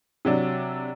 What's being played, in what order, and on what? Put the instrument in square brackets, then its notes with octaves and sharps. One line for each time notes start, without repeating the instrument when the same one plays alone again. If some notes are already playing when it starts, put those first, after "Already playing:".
[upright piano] C3 F#3 D4